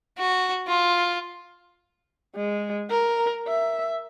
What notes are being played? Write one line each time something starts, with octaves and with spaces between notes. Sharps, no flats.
F#4
F4
G#3
A#4
E5